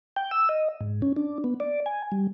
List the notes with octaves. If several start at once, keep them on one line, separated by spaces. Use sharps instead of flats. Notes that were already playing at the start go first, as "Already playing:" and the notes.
G5
E6
D#5
G#2
C#4
D4
B3
D5
G#5
G3